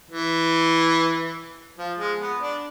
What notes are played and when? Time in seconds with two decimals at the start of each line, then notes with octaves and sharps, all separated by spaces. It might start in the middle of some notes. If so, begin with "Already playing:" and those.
0.10 E3
1.78 F3
1.98 G#3
2.20 B3
2.41 D4